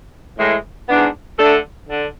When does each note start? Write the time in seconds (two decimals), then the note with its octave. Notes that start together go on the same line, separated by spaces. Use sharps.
0.37 A2 E3 G#3
0.88 G#2 E3 B3 D4
1.38 D3 A3 D4 A4
1.89 D3